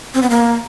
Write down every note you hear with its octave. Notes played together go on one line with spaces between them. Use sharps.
C4
B3
A#3